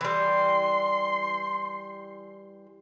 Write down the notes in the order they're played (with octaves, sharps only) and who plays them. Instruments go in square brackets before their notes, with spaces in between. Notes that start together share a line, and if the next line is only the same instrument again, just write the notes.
[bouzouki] E3 G3 [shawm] C6